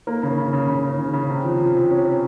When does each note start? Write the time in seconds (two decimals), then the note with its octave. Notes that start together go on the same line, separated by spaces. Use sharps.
0.07 A#3
0.23 C#3
0.37 C#3
0.53 C#3
0.68 C#3
0.84 C#3
0.98 C#3
1.13 C#3
1.29 C3
1.44 F3
1.59 F3
1.75 C3
1.90 C#4
2.05 C#4